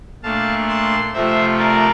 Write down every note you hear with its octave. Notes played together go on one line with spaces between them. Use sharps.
A#2 A3 D4 F5 A5
A5 C6
C3 F3 A3 C5 E5
A#4 D5